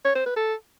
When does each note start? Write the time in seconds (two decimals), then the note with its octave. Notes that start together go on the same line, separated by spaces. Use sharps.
0.05 C#5
0.16 C5
0.26 B4
0.37 A4